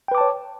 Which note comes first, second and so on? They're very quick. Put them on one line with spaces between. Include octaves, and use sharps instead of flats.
G5 B4 D6 A5 C#5